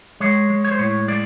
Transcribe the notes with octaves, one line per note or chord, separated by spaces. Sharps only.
G#3 C#5
G#3
C#5
C5
A2 C#5
G#3 D5